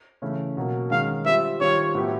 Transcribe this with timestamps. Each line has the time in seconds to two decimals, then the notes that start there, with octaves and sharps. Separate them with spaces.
0.22 C#3 E3 A3 C#4
0.57 B2 F#3 A#3
0.91 D#3 G#3 C#4 F5
1.25 G3 C4 F4 E5
1.60 D#3 G3 C4 F4 C#5
1.95 A2 F#3 B3 E4 G4